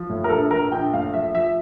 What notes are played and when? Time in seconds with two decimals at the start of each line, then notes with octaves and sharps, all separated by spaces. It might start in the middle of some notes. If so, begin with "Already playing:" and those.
Already playing: F3
0.10 A2
0.24 A#4
0.29 A#1 A4
0.51 A#1 A#4
0.72 A#1 G5
0.93 A2 F5
1.14 F3 E5
1.35 F3 E5